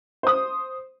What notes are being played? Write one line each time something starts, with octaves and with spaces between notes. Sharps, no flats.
C5 D#6